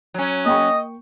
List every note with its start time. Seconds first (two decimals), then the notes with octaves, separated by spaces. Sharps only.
0.14 F#3 C#4
0.46 A#3 D#5 G5 C#6